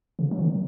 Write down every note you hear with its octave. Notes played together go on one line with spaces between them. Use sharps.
C#3
F#3
D#3